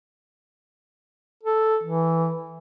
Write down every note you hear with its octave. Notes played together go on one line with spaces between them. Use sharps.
A4
E3